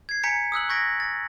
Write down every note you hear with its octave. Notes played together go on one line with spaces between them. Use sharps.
G#6 C7
G#5 A#5 G6 B6 C#7 D7
D#6 E6 F#6 F#7
C#6 G6 G#6 A#6 B6 D7
A6